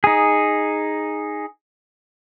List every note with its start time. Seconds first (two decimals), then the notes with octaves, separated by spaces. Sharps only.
0.04 D#4 G#4